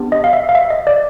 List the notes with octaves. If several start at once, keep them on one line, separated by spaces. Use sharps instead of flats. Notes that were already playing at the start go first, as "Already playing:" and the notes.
Already playing: B3 D4 G4
D#5
F5
E5
F5
E5
D#5
D5